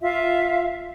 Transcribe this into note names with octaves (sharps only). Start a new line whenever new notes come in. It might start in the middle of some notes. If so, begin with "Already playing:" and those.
F4 E5 F5